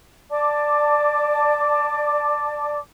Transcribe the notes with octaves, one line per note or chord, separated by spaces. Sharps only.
D5 A5 D6